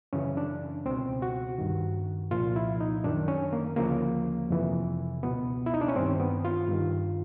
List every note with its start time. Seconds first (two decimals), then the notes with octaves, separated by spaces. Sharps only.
0.13 F#2 C#3 E3 C#4
0.37 D4
0.85 C#2 B2 C4
1.22 F#4
1.58 G2 D#3
2.31 C2 A#2 F3 F4
2.56 E4
2.80 D#4
3.04 F#2 D#3 D4
3.28 C#4
3.53 A#3
3.76 D2 C#3 F3 A#3
4.50 F2 C3 E3
5.22 C#2 B2 B3
5.66 E4
5.74 D#4
5.81 D4
5.88 C#4
5.95 G2 D#3 C4
6.20 B3
6.45 F4
6.68 G2 D#3